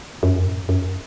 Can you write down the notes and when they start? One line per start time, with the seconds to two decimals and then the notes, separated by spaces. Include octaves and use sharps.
0.23 F#2
0.38 F2
0.47 A2
0.53 F#2
0.69 F#2